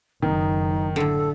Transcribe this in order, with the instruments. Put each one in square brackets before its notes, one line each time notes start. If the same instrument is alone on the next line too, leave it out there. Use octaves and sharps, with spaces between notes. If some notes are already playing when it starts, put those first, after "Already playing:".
[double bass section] F#1 [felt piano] D#3 [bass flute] D#4
[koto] A2 D3 [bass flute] A4